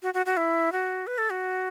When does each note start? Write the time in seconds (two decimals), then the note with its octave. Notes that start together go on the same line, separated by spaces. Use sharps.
0.02 F#4
0.14 F#4
0.26 F#4
0.37 E4
0.72 F#4
1.07 B4
1.18 A4
1.30 F#4